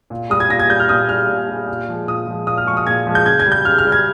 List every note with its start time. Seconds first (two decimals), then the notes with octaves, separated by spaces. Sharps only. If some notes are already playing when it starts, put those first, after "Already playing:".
0.10 A#2
0.30 G3 D#6
0.40 G#6
0.50 A#2 A#6
0.59 G#6
0.69 G3 G6
0.80 F6
0.89 A#2 D#6
1.09 G3 F6
1.28 A#2
1.49 G3
1.68 A#2
1.89 F3 G#3
2.07 A#2 D#6
2.27 F3 G#3
2.47 A#2 D#6
2.58 F6
2.66 F3 C#6
2.70 G#3
2.77 D#6
2.87 A#2 G#6
3.07 F3 G#3
3.15 G6
3.26 C#3 G#6
3.40 G#6
3.46 G3
3.52 G6
3.65 C#3 F6
3.78 F6
3.85 G3
3.92 G#6